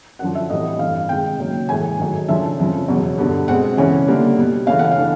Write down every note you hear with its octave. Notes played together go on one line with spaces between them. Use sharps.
F#2 D3 F3 F#5
E5
A2 E3 G3 C4 D#5
G2 E3 A3 F5
C3 D#3 G#3 G5
C#3 F#3 A#3
A2 E3 G#3 G#5
G#2 D#3 F#3 A3
C#3 F3 A3 D4 E5
F2 C#3 F3
E2 B2 F#3
G2 D3 G3 B3
B2 G#3 C4 F#5
C#3 E3 A3 C#4
D3 G3 A#3
B2 G3 B3
C#3 E3 A3 C#4 F5
F#5
F5
E3 A3 D4